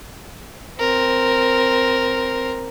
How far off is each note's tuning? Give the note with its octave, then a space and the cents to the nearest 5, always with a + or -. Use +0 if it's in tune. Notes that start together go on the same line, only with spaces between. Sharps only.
C4 +0 A#4 +0